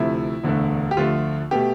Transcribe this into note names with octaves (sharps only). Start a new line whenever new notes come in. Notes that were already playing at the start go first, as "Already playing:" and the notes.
Already playing: D2 C3 F3 A3 E4
E1 D2 D3 A3
G4
D2 D3 F3 A3 F4
B2 A3 G4